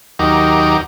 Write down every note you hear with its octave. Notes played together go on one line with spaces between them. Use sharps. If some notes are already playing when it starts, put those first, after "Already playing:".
D#2 F#3 D#4 G4 A#4 D6